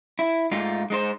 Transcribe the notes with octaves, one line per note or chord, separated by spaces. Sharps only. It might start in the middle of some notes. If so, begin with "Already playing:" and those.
E4
G#2 A3 D#4 F4
G#3 D#4 C5